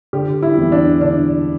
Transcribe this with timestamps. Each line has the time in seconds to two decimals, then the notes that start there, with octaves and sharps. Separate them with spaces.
0.13 D3 G4
0.43 E4
0.57 E2
0.72 D4
1.01 D3 D4